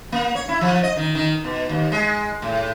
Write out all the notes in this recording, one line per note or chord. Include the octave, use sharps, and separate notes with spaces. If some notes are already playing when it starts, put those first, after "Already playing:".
A#3
C#5
E4
F3
D#5
D#3
D#3
B2
D#2
G#3
A2